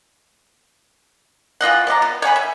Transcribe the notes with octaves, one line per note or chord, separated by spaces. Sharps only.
E3 F4 D#5 F#5
B3 D5 D#5 A#5
B3
C#5 F#5 G#5 B5
E5